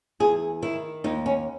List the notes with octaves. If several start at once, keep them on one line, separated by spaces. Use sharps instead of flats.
E2 G#4
D#3 E4
D#2 D#4
C#4